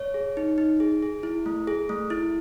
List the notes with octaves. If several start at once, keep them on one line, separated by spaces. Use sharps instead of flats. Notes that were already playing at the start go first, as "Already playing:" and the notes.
Already playing: C#5
G#4
D#4
D#4
G#4
G#4
E4
A3
G#4
A3
E4